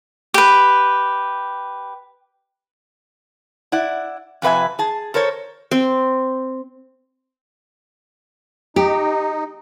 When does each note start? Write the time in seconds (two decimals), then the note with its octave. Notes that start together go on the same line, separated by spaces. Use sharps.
0.34 G4 B4
3.72 E4 D5 F#5
4.42 F2 C3 B4 E5 G#5
4.79 G#4 A5
5.14 A4 A#4 C5 C#5
5.71 C4
8.76 D#4 G4